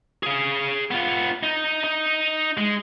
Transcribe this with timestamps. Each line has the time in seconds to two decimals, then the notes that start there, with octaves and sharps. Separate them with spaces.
0.23 G#4 F5
0.91 B3 F4
1.43 D#4
1.84 D#4
2.57 G#3